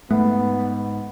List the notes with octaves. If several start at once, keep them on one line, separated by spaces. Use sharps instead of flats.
G#2 A3 B3